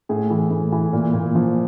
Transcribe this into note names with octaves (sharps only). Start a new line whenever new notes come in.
A2 G#4
E3
A2
E3
A#2
A#2
F3